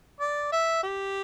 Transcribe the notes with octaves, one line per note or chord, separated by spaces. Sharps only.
D5
E5
G4